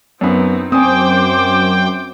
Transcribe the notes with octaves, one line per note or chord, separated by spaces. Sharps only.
F#2 B3 C4 D#4
F#2 C4 C5 G5 G#5 D6 D#6